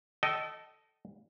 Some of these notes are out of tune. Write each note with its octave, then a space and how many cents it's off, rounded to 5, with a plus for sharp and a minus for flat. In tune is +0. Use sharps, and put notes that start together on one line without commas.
A4 +0 D#5 +0 G5 -40